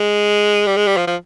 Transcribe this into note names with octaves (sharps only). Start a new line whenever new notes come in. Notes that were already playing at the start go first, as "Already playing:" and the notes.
Already playing: G#3
G3
G#3
G3
F3
F3